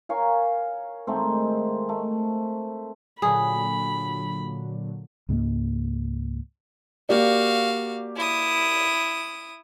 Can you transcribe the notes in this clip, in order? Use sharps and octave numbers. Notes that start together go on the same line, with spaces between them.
A#4 C#5 F5 G#5
D#3 G#3 A3 C4
A3
A#2 D3 F#3 G#4 B5
C#2 G#2 G#3 A#3
A#3 F#4 G4 D5 F5
E4 D#6